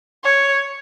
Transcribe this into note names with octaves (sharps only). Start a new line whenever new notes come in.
C#5